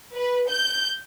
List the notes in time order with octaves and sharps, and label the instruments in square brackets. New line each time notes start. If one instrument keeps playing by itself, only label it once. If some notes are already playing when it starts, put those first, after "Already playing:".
[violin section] B4
G6